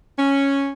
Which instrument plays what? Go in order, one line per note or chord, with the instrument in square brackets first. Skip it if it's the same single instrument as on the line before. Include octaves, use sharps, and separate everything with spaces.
[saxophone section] C#4